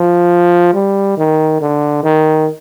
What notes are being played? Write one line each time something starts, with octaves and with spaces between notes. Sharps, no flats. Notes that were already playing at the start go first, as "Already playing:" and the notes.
Already playing: F3
G3
D#3
D3
D#3